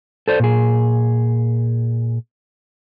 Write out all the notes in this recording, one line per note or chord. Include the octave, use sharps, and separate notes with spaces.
A4 C5 D5
A#2 G#4